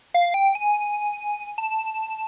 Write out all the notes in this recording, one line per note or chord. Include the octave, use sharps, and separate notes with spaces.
F5
G5
G#5
A5